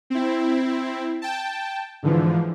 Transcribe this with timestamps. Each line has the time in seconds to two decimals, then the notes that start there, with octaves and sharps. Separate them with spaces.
0.10 C4 E4
1.22 G5 A5
2.03 G#2 D3 E3 F3